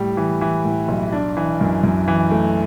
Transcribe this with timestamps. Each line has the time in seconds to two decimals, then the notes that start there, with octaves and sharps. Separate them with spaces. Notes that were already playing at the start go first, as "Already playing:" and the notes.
Already playing: A2 G3
0.17 E3
0.41 E3
0.65 A2
0.88 B1
1.12 D4
1.37 E3
1.61 F#2
1.83 F#2
2.08 E3
2.31 A3